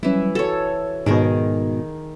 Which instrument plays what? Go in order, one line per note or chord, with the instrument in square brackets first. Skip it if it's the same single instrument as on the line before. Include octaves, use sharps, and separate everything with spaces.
[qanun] E3 E4 [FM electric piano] F#3 G3 C#4
[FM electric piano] F#4 [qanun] A4 C#5
[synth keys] G#2 B2 [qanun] D#3 G#4 A#4